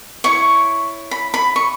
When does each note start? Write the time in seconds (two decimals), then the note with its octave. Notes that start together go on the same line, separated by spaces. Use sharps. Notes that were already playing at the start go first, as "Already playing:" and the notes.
0.24 E4 C#5 C#6
1.11 B5
1.34 B5
1.56 C#6